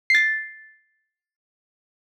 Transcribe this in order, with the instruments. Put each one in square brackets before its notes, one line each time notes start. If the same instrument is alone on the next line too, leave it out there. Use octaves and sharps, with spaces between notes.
[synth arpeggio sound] A6 C7